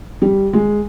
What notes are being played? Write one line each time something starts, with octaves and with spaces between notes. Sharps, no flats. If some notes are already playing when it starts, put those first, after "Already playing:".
G3
G#3